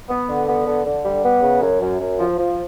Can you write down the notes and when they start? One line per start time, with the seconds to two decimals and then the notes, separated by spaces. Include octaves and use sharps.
0.09 B3
0.28 D3
0.47 B3
0.66 D3
0.85 D3
1.05 G3
1.23 B3
1.42 C#3
1.61 F#2
1.81 F#2
2.00 F#2
2.18 F3
2.38 F3